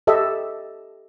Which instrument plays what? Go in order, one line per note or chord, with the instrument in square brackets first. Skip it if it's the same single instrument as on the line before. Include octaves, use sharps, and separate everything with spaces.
[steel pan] G4 A4 D#5 E5